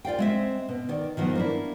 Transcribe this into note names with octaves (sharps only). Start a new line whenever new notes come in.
F4 D5 F5 G5
G#3 C4 E5
B2
D#3 D5
D#3 F3 F#3 B3
A#3 D4 E4